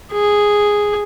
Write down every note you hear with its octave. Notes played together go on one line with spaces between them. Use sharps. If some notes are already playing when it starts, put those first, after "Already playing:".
G#4